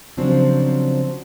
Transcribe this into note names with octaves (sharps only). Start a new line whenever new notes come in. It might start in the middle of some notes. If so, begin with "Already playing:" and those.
C#3 F3 F#3 C4 D4